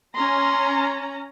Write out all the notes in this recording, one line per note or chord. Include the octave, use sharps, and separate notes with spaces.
C#4 A#5 C6